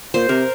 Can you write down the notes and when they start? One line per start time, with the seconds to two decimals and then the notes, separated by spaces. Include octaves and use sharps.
0.14 A#2 C5
0.29 C3 A#4